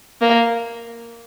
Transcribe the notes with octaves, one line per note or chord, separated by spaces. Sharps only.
A#3